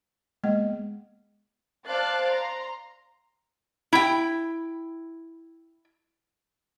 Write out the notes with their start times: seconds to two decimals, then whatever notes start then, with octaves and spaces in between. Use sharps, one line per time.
0.44 G#3 A#3 B3 D#5
1.86 C5 D5 F5 A5 F#6 A6
2.30 A#5 C6
3.93 E4 G5